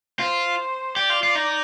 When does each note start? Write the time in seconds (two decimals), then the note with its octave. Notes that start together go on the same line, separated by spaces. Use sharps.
0.19 F4 C5
0.96 G4 D5
1.10 F4
1.23 F4
1.35 D#4